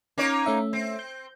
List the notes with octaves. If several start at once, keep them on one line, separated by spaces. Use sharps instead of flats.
A#3 C#4 D#4 C#5
A3 C#4 E5
C4
G6